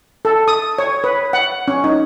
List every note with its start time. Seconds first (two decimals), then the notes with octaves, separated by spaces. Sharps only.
0.25 A4
0.48 D#6
0.79 C#5
1.04 B4
1.33 F#5
1.68 C#4
1.84 D#4